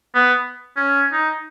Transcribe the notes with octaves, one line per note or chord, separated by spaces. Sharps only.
B3
C#4
D#4